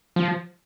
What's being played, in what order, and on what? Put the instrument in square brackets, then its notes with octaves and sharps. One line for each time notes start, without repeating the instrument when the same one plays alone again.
[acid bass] F3